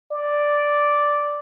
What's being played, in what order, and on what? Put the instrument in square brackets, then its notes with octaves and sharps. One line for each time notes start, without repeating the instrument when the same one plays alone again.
[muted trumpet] D5